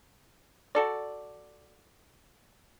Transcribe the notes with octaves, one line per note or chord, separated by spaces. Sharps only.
F#4 A4 D5